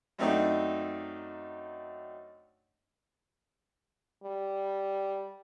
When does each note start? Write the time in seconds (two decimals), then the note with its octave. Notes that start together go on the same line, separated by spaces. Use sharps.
0.18 F#2 A3 C4 D4 D#4
4.24 G3